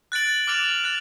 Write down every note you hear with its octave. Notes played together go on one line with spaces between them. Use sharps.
F#6 A6 D7 F#7
D6 F6 A6 D7 F7
F#6 A6